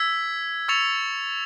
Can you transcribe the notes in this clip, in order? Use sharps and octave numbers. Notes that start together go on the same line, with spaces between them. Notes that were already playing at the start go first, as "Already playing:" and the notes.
Already playing: E6 G#6 B6
C#6 E6 A6 C#7 F7